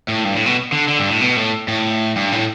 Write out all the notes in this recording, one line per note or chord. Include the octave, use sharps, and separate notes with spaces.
A2
G2
A2
B2
D3
D3
G2
A2
B2
A2
A2
G2
A2